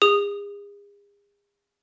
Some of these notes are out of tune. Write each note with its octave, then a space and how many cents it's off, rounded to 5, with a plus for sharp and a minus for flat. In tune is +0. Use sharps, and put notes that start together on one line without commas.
G#4 -40 D#6 -10